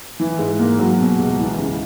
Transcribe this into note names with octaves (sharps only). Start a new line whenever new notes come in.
E3
G#2
A#3
F#3
B2
C#2
E3
C#3